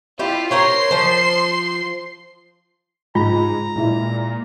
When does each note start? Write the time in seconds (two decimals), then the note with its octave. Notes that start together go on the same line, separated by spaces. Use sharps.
0.19 E4 F4 G4
0.51 A#4 C5 C#5 C6 C7
0.91 F3 C5
3.15 G#2 G#3 F4 A#5
3.76 A#2 G#3 E4